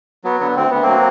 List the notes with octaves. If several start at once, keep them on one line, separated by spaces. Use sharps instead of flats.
F#3 B3
D3 B3
D2 C4
D2 B3
A#3 C4
F#3